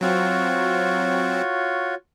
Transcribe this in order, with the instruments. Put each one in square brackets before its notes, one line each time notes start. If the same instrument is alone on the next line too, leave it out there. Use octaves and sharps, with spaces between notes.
[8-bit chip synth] F#3 C4 [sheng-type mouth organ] F4 F#4 C#5